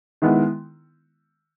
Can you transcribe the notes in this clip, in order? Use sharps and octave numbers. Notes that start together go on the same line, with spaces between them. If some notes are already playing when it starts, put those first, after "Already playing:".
D#3 G#3 B3 E4